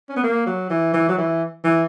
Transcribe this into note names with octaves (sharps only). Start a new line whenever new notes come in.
C#4
B3
A#3
F#3
E3
E3
F#3
E3
E3